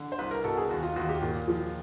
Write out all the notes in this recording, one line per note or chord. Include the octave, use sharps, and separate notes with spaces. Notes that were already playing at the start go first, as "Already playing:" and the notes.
Already playing: D3
C5
C2 B4
A#4
B2 A4
G#4
D#2 F#4
F4
D#2 F#4
G4
A#2
F3